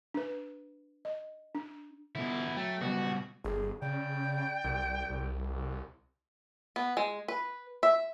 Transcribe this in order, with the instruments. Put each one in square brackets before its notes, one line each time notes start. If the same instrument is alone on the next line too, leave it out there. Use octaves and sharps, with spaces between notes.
[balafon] D4 B4
D#5
D4
[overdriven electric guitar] B2 E4 [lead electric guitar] D3 B3
[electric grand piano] F#3 [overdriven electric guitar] A3 [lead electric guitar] G5
[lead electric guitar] C#2 G3 [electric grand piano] B2 [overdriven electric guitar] F#4
[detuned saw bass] G1 [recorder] G#4
[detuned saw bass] C#3 [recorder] D5 [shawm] G5
[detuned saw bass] C2
C2
[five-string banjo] B3
G#3
B4
E5